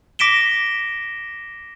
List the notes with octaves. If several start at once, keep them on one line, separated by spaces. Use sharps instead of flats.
D6 A#6 B6 D7 E7 G7